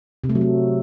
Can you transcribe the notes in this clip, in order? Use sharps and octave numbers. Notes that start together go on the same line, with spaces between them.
C3
A3
F#3
A3